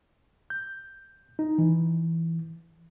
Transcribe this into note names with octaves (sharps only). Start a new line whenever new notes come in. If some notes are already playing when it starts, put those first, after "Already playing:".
G6
D#4
E3